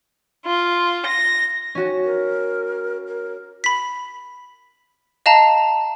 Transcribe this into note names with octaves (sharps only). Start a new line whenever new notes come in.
F4
A#6
C#4 F#4
A#4
A#4
B5 B6
D#5 F5 A5 A#5